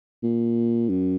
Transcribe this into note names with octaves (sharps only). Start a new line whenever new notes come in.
A#2
F#2